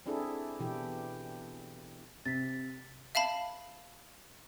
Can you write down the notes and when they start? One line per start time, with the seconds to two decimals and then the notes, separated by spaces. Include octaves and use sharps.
0.06 C4 D4 E4 G#4 A4
0.60 B2 E3 E4 G4
2.25 C3 A6 B6
3.15 E5 F5 A5 B5